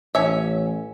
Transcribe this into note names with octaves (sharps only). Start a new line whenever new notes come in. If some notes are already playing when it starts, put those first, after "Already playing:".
A1 C#4 E5